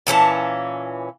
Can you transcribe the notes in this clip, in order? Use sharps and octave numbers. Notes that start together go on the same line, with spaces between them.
A#2 E3 C#4 A5